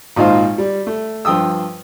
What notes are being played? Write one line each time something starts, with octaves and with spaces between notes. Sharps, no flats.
G#1 A#2 D#4 C5 F5
G3
A3
G2 F3 G5 D#6 E6